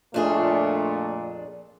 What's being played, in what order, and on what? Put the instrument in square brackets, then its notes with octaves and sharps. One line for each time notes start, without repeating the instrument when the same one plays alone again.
[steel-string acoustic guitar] F2 D4 G#4 [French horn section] A#2 A3